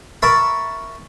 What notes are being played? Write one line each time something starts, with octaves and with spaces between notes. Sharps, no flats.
A#4 E5 A5 B5 C#6